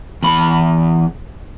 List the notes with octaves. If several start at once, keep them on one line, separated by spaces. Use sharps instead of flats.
E2 B5